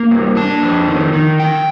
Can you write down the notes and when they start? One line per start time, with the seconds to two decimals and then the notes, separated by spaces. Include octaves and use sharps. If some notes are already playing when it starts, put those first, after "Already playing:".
Already playing: A#3
0.11 G2
0.37 D4 A5
0.62 F2
0.88 D#3
1.13 D#3
1.39 F2 G5